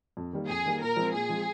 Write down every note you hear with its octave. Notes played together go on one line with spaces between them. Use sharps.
F2
D#3 G3 A#3
F2 G#4
D#3 G3 A#3
A#2 A#4
F3 G#3 C4
A#2 G#4
F3 G#3 C4